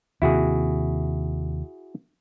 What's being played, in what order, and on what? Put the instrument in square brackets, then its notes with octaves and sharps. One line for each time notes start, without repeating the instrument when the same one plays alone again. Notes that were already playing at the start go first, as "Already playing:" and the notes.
[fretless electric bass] D#2 C3 [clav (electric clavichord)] E4 F#4 G#4